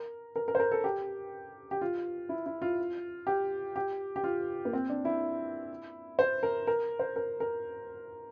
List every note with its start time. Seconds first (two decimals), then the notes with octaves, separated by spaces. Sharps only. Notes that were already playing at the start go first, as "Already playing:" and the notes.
Already playing: A#4
0.36 A#4
0.48 A#4
0.55 C5
0.59 A#4
0.72 A4
0.84 G4
1.71 G4
1.81 F4
2.29 E4
2.46 E4
2.62 F4
3.27 G4
3.76 G4
4.16 G4
4.24 F4
4.65 A#3
4.73 C4
4.89 D4
5.05 E4
6.19 C5
6.43 A#4
6.67 A#4
6.99 C5
7.16 A#4
7.40 A#4